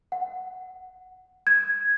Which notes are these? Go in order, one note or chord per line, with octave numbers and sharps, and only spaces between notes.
F#5
G#6